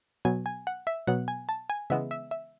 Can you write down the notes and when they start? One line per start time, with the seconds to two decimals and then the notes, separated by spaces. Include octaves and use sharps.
0.25 B2 F#3 B3 G#5
0.46 G#5
0.67 F#5
0.87 E5
1.07 B2 F#3 B3 F#5
1.28 G#5
1.49 A5
1.70 G#5
1.90 C#3 E3 G#3 B3 E5
2.11 E5
2.31 E5